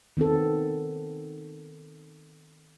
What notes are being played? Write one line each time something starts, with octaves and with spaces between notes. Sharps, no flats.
D#3 B3 C4 A4